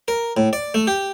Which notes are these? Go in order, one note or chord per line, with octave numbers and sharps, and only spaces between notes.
A#4
A2
D5
A3
G4